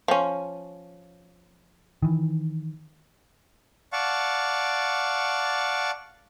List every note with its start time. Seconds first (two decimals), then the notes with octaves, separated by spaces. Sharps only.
0.08 F3 C#4
2.02 D#3 E3
3.93 D5 F5 F#5 A5 C#6